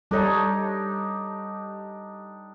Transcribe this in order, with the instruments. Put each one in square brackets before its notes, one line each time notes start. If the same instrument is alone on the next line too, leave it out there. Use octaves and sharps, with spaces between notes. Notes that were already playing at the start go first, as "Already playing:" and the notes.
[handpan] G3 A4 C#5 [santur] D4 D#4 G4